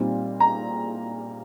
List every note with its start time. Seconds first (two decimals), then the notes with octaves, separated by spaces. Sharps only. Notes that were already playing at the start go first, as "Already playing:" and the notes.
Already playing: A#2 G3 C4 D#4
0.40 A#5